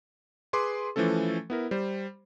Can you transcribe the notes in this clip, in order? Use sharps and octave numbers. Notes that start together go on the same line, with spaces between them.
G#4 B4 C6 D6
E3 F3 A3 C#4 A4
B3 E4 A#4
G3 C5